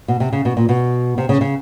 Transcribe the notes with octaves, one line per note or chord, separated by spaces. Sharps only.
B2
C3
C#3
B2
A#2
B2
C3
C#3
C#3